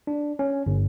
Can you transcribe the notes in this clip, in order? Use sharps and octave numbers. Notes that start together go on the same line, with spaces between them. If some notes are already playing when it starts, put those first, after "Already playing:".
D4
C#4
G1